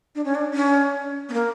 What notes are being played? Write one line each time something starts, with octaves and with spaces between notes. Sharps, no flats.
D4
C#4
D4
C#4
B3
A#3